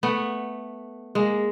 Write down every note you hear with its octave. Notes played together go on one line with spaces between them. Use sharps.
A3 B3
G#3 A#3